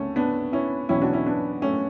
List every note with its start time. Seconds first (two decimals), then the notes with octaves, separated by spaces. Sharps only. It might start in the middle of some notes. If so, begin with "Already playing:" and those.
Already playing: D2 C#3 A3 C#4
0.16 B3 D4
0.52 C#4 E4
0.89 E1 E2 B2 F#3 C#4 E4
1.02 D4 F#4
1.13 C#4 E4
1.26 B3 D4
1.62 A3 C#4